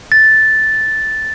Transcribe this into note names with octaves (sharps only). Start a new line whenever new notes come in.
A6